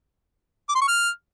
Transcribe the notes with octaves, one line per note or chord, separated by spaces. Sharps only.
D6
C6
C#6
F6